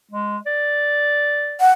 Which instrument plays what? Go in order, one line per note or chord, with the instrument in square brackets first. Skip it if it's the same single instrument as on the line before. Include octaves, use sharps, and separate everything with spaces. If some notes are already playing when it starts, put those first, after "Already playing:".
[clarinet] G#3
D5
[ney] F#5